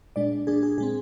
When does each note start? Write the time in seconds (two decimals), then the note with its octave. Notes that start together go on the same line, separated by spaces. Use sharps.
0.16 A#2 G#3 D4 D5
0.47 A#2 G#3 D4 G#4
0.63 G#4
0.78 A#2 G#3 C4 G#4